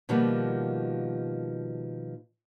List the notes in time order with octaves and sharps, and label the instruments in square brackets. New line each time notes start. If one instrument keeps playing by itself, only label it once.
[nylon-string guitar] B2 D#3 F3 G3 A#3 B3